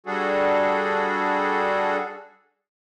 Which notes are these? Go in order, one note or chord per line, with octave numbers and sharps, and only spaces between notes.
G3 D4 F#4 G#4 A4